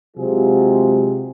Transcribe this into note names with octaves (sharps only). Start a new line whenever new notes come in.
C3 F#3 G#3 F4 G#4